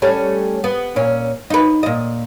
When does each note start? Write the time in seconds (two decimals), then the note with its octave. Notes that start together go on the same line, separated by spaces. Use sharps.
0.02 G3 A3 C#4
0.64 B3
0.96 A#2 C#4
1.50 D#4 B4
1.83 A#2 D#5